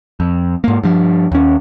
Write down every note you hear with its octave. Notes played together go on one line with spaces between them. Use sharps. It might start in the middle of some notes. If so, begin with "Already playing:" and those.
F2
G#2 A#3
G2 F3
D#2 C#4